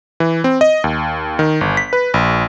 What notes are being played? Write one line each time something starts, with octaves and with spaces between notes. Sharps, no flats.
E3
C4
D#5
D#2
D#3
G1
B6
B4
A#1